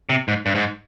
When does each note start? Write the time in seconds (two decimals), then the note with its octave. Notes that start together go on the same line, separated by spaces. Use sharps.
0.09 C3
0.28 G#2
0.46 G2
0.55 G#2